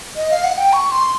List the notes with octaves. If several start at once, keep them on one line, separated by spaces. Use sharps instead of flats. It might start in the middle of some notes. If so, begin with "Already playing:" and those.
D#5
F5
F#5
G5
C#6
C6